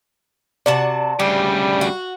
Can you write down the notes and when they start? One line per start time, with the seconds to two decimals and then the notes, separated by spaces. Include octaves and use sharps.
0.66 C3 F#4 D5 A5
1.20 D2 C#3 G3 G4
1.81 F#4